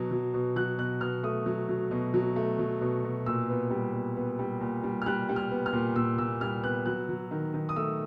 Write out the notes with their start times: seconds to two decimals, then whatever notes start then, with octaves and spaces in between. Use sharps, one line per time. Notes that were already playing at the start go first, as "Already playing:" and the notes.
Already playing: B2 F#3
0.11 F#3
0.34 B2
0.56 F#3 F#6
0.78 B2 F#6
1.01 B2 F6
1.23 A3 D#6
1.46 F#3
1.69 F#3
1.91 B2
2.14 F#3
2.36 A3
2.59 F#3
2.81 B2
3.04 B2
3.26 A#2 E6
3.49 B3
3.70 G3
3.93 B3
4.16 B3
4.39 G3
4.61 A#2
4.83 G3
5.02 F6
5.06 G3 F#6
5.29 G3
5.36 F6
5.51 B3
5.66 F6
5.73 A#2
5.96 A#2 E6
6.18 A#2 E6
6.41 G3 F6
6.63 B3 F#6
6.86 F#3 F#6
7.09 F#3
7.31 D#3
7.54 D#3
7.69 D#6
7.76 A3 E6